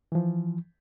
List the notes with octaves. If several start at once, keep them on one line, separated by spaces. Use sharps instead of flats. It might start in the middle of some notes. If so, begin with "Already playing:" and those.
E3 F3